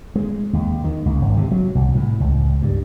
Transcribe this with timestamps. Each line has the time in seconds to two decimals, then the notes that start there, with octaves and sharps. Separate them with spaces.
0.16 G#3
0.53 D#2
0.84 D#3
1.06 C#2
1.22 G#1
1.37 C3
1.52 F#3
1.75 C2
1.95 A2
2.20 C#2
2.63 G2